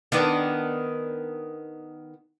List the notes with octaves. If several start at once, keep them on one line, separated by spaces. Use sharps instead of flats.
D#3 B3 D4